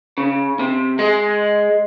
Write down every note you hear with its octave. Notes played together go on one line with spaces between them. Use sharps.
C#3
C3
G#3